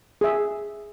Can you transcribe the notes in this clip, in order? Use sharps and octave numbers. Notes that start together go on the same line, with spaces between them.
G#4 E5